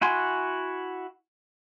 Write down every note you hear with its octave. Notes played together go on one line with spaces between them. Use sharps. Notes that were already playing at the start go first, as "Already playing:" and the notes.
E4 F#4 G#5 C6